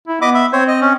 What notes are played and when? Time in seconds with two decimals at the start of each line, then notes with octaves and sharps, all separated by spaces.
0.08 E4
0.22 B3 D#5 B5 D6
0.34 E5 B5
0.52 C4 C5 C#5
0.68 D#5
0.81 C#4